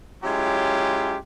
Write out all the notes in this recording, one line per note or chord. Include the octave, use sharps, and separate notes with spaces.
F#3 G#3 C#4 E4 F4 G4